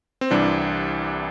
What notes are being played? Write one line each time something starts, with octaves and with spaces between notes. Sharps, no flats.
C4
C2 C3 E3 G3 D4